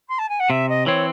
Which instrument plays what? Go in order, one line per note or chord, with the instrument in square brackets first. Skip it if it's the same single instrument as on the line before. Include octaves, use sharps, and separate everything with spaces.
[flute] C6
A5
G#5
F#5
[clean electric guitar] C3 [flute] E5
[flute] D#5
[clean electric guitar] E3 C4 [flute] C#5